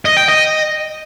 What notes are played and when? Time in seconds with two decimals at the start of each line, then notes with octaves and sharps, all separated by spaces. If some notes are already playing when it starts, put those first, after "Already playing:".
0.05 D#5
0.17 G5
0.28 D#5